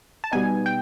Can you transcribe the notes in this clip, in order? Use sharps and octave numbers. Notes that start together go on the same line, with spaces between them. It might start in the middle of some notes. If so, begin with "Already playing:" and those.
A5
B2 G3 B3 D#4 G#5
G5